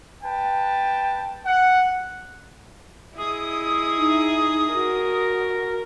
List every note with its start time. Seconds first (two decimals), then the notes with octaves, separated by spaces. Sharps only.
0.24 B4 G5 A5
1.45 F#5
3.18 E4 G#4 D#5 D#6
3.98 D#4
4.73 F#4 A#4